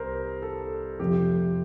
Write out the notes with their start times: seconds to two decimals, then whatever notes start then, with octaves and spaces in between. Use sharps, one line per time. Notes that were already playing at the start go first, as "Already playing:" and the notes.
Already playing: C2 C3 A#4 C5
0.42 A4
1.00 F2 C3 F3 A3 G4